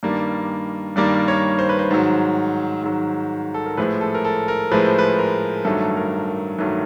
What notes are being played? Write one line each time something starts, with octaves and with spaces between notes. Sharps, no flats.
G2 D#3 G3 A#3 D5
G2 D#3 G3 A#3 D5
C#5
C5
B4
C5
G#2 D#3 F#3
G#2 D#3 F#3
A4
A#4
A2 F3 G#3 B4
A4
A#4
A4
A#4
A2 F3 G#3 B4
C5
B4
A#4
G2 D#3 F#3 A3 A4
A#4
A#4
G2 D#3 F#3 A3